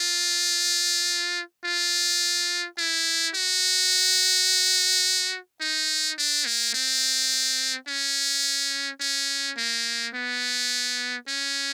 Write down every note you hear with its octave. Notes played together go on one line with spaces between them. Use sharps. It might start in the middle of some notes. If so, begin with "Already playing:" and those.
Already playing: F4
F4
E4
F#4
D#4
D4
A#3
C4
C#4
C#4
A#3
B3
C#4